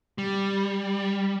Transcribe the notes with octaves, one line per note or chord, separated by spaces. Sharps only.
G3